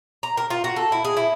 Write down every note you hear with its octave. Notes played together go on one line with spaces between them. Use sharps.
A#5
A#4
F4
F#4
A4
E4
G#4
E4